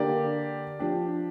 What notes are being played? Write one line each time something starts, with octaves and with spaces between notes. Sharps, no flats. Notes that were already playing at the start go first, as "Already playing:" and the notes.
Already playing: D3 A#3 G4 D5
F3 D4 G4